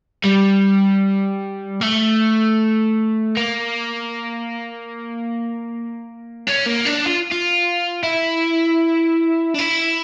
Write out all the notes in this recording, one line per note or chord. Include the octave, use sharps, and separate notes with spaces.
G3
A3
A#3
C#4
A#3
D4
F4
F4
E4
D4
E4